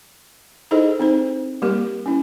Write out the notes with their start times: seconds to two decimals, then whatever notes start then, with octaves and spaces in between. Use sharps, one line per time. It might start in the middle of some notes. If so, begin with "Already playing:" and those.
0.71 D#4 E4 G#4 A4 C5 D#5
0.99 C4 D#4 C5
1.62 G3 A#3 G4 A#4
2.06 C#4 E4